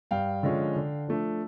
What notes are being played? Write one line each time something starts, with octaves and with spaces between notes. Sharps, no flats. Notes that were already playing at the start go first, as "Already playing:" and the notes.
G2 F5 G5
D3 F3 G#3 C#4
D3
F3 A3 D4